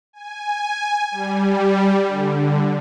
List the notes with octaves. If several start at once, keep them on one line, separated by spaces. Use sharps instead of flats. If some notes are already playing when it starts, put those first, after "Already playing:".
G#5
G3
D3